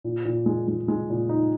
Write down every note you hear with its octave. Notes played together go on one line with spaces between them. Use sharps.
A#2
A#2
G#3
G#3
G#3
A#2
D#4